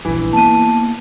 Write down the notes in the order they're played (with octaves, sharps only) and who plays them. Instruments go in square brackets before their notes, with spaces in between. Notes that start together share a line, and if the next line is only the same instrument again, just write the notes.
[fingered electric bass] A#1 G2 [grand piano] E3
[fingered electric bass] A#3 B3 [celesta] A5 D#7